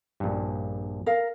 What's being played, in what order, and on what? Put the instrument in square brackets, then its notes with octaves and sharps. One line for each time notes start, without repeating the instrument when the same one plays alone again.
[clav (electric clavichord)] A#1 G2
[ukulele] A#4 F5